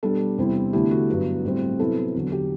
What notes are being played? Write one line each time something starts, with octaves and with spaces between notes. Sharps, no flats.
B2 G3 D4 A4
E2 C3 G3 C4 E4
E2 D3 A3 E4 G4
F#4
G2 F#3 B3
A2 G3 C4
C3 F#3 B3 E4 A4
E2 D3 F#3
G4